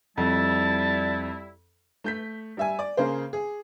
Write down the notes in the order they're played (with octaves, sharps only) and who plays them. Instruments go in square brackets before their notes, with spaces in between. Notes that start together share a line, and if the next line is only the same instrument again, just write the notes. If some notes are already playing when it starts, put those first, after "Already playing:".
[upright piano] F2 [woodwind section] G3 E4 [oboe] A5
[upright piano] A3 G6 B6
G3 E5 G#5
D5
C#3 A#3 G#4 C5
G#4